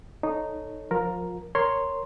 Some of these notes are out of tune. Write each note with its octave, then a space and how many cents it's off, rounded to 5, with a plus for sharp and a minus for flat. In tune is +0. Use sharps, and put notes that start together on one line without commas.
D#4 -10 A4 +0 C#5 +0
F3 +25 F4 +30 A#4 +0
A#4 +0 C#5 -5 C6 +0